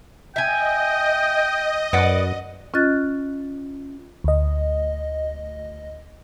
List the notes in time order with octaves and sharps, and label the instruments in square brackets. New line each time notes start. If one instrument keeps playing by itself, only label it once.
[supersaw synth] D#5 [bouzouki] E5 G#5 [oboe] G5
[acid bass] F#2 [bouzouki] B4 D5 F#5
[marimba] C#4 F4 D#5 F#6 A6
[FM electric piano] D2 D#5